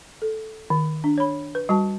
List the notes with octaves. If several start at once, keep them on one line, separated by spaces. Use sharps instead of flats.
A4
D#3
D4
C#5 B5
B4
G3 F#4 A5